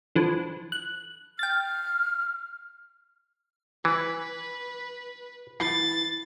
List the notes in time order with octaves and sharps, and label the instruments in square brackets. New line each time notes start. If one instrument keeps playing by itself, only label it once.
[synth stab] D3 E3 F3
F#6
[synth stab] G5 A6 [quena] F6
[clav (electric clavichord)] E3 [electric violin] B4
[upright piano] E3 B5 C7 [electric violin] A6